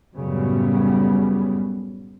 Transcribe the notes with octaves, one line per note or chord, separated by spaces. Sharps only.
F#2 A2 C#3 F#3 G3 B3